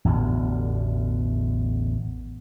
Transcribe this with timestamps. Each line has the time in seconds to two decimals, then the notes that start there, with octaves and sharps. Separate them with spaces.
0.05 A1 E2 B2 D3